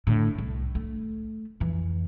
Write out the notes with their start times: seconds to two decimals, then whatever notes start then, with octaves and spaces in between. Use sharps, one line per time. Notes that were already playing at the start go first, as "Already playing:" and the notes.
0.07 A2 D3
0.38 C2
0.75 A3
1.60 F2 E3